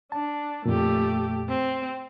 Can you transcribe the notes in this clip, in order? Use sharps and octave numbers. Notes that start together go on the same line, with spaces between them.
D4 A5
F2 A#2 A3 G4
C4